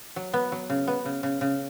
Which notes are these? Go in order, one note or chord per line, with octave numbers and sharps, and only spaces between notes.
F#3
B3
F#3
C#3
B3
C#3
C#3
C#3